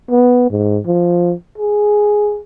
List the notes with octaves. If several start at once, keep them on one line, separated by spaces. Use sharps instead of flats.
B3
G#2
F3
G#4